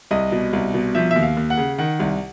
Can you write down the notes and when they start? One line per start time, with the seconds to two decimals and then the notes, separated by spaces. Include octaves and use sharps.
0.11 C2 D#5
0.32 B2
0.53 C2
0.74 B2
0.95 F3 E5
1.11 D#2 E5
1.23 F5
1.37 D#2
1.50 F#5
1.57 C#3
1.78 D#3 F#5
2.00 C2